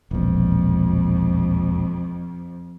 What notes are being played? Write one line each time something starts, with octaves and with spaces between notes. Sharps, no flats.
E1 A#1 F2